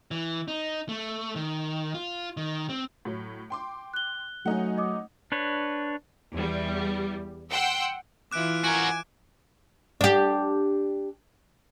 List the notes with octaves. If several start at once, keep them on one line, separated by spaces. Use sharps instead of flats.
E3
D#4
A3
D#3
F4
D#3
C4
A2 F#3
G5 C6 D6
F#6 G7
F#3 A3 C#4 D#4 F#5
D#5 D6 D#6
D4 B4 C#5
E2 G3
F#5 G5 C6 E6
E3 E4 F4 D6 F#6 D7
F#4 A#4 G#5 F#6 D7
D4 G4